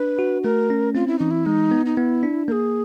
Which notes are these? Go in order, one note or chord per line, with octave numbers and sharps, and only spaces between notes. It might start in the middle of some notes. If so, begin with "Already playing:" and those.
Already playing: D4 B4
F#4
A3 A#4
C#4
C4 F4
E4
E3 D#4
E4
G#3 D#4
B3
D#4
B3 E4
D4
A#3 G#4 A#4